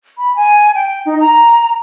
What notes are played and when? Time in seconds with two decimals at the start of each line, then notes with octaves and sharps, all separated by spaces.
0.18 B5
0.36 G#5
0.75 G5
1.06 D#4
1.20 A#5